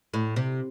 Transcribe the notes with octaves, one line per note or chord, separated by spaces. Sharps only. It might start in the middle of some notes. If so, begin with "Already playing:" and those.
A2
C3